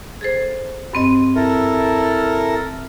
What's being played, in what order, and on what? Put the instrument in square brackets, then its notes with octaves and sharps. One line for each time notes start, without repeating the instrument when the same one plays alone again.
[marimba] G#4 A4 C5
G2 C4 D#5
[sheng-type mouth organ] E4 A4 A#4